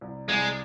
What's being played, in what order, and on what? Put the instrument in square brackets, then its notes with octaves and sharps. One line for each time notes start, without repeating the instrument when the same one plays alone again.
[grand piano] C2
[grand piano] C2 [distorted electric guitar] G#3